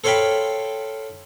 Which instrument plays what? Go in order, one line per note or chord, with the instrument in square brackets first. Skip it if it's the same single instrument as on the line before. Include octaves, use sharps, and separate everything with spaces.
[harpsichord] A4 C5 C#5 F5 G5 B5